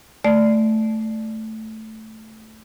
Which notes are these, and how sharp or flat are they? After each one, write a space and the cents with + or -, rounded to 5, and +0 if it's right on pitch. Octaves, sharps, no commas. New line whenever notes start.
A3 +0 D5 +0